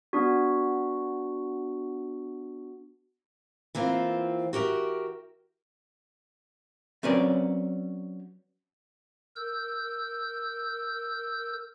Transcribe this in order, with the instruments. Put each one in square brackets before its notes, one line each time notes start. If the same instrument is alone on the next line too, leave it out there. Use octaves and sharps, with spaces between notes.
[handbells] B3 D4 F#4
[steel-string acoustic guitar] E3 A#3 C4 F4
F#4 G4 A#4 E5
[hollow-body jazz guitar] F#3 C4 C#4 A#4 B4 D5
[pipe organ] A#4 E6 G6